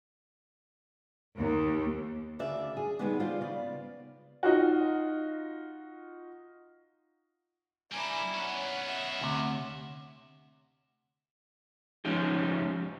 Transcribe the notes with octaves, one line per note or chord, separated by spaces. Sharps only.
D#2
D2 C#3 D4 D5 E5
G#4
D#3 F3 G3 G#3 B3 D4
F4 C5 D5 F5
C#3 B3 D5
D#4 F4 F#4
G3 A#3 D4 E4 G#5 A#5 D6
B3 C#4 C#5 F#5
D#5 E5
D2 C3
F3 G#3 C#4 D#4 G4